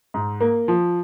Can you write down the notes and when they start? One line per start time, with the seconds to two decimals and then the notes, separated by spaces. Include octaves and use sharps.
0.14 G#2
0.41 A#3
0.68 F3